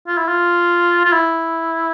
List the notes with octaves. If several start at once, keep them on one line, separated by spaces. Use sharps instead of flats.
F4
E4
F4
F4
E4